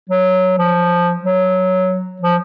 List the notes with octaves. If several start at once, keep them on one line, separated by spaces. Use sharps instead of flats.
F#3
F3
F#3
F3